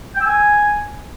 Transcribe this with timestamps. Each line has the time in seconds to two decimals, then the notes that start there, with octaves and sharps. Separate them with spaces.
0.15 G5
0.20 E6
0.26 G#5